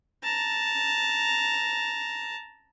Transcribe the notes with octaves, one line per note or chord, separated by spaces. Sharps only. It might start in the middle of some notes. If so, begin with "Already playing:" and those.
A5 A#5